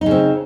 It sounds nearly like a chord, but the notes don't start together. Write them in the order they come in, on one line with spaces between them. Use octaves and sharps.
D#4 C#3 C4